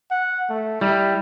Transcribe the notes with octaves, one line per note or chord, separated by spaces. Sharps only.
F#5
A3
G3 E4